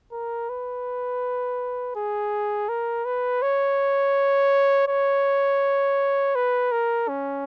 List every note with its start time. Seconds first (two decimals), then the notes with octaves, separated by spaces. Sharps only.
0.12 A#4
0.49 B4
1.96 G#4
2.69 A#4
3.05 B4
3.42 C#5
4.88 C#5
6.35 B4
6.72 A#4
7.08 C#4